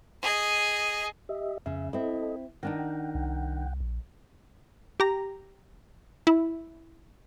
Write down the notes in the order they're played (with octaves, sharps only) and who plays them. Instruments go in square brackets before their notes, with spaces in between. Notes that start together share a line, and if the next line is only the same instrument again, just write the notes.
[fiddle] G#4 D#5
[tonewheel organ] G4 D#5 E5
[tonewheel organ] F2 E5 [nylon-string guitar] C#3
[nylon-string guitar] C4 E4 [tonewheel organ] A4 D#5
[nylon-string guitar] D#3 D4 D#4 [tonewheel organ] F#5 G5
[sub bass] C2
A#1
[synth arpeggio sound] G4 A#5
E4